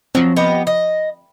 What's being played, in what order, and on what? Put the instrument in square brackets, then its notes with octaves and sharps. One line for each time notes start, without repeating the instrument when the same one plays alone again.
[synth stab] F3 C4 [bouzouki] F#3
[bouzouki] B3 G4 D#5
D#5